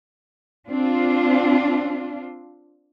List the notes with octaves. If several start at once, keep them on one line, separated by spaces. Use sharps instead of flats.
C4 D4 F4